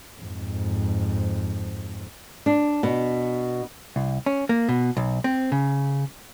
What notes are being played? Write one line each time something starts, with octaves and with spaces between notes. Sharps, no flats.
F2 G#2
D4
B2
C2
C#4
A#3
B2
B1
C4
C#3